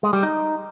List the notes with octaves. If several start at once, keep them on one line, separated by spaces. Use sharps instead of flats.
G#3
G3
D#4